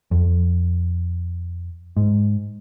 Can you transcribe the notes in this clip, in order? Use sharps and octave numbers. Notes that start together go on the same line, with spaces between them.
F2
G#2